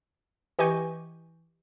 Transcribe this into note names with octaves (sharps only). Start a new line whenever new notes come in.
E3 G4 D#5 G#5 C#6 G6